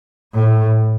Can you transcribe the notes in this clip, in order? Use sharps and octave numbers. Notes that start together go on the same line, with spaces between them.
A2